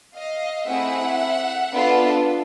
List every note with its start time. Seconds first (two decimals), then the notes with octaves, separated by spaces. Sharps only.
0.15 D#5 F5
0.67 A3 C4 E4 G#4 E5 F#5
1.73 B3 D4 F4 A4